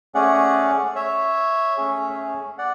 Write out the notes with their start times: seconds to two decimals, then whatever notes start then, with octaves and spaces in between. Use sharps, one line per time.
0.15 A3 C#4 G#4 D5 F#5
0.96 C#5 E5
1.77 A3 C#4 G#4
2.58 D5 F#5